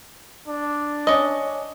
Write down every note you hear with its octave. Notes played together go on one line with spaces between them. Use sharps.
D4
C#4 D#5